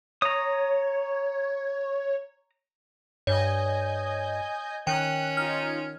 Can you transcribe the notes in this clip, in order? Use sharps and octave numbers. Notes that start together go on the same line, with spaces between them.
C#5 A#5 D#6
G2 C#5 D#5 G#5 G6
D#3 C#4 G5 F#6
D#4 F4 F6